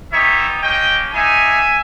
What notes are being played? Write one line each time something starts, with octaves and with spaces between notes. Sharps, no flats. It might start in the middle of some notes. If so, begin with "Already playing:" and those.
B3 D#4 G4 C#5 E5
A#3 C#4 G4 D#5 G5
G#3 D#4 G4 E5 G#5